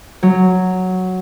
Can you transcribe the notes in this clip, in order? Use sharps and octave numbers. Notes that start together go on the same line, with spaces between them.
F#3